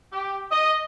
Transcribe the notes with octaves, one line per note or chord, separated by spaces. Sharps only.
G4
D#5